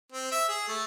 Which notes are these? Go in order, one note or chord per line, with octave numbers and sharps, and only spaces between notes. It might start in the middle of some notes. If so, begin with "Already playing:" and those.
C4
E5
G#4
A3